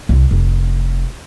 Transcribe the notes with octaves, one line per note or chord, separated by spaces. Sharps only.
C2
F1